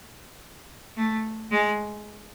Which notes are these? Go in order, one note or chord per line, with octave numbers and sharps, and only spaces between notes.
A3
G#3